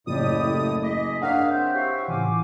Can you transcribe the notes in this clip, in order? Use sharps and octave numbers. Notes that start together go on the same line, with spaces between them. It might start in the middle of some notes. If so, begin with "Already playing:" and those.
F#1 A2 G4 D5 D#6
G#4 D#5 E5 D6
A#3 D4 C#5 D#5 F5 F#5
C4 E5 G6
E4 G4 C#5 F5 C#6
A2 C#3 E3 F4 G#5 D6